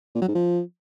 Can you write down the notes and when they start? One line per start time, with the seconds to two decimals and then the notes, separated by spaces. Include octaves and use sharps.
0.15 A#2
0.22 F#3
0.28 G#2
0.35 F3